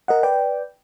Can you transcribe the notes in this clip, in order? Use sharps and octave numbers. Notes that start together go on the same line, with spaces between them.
A#4 D#5 F#5
B4 D5 G5